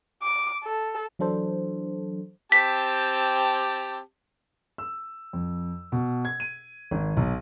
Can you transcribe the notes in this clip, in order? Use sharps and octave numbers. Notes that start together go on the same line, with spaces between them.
D6
A4
E3 F#3 D4 A4 C5
C4 G4 A5 B6
E6
F2
B2
G#6
D#7
G#1
B1